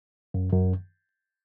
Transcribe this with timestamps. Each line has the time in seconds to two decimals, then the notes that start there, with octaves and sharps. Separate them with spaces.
0.34 F#2
0.53 F#2